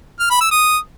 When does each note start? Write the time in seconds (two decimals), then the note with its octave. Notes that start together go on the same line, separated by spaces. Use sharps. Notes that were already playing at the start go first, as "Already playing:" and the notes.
0.20 F6
0.30 B5
0.41 E6
0.51 D#6